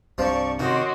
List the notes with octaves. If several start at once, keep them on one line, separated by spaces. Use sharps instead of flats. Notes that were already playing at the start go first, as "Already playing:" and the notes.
C2 G2 C3 F3 D5 C#6
C3 D#3 C#4 F#4 D#5 C6 D6